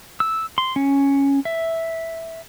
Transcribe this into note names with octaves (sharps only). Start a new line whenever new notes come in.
E6
C6
C#4
E5